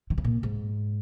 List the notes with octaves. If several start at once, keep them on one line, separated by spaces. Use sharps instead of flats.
D#3
C#3
A#2
G#2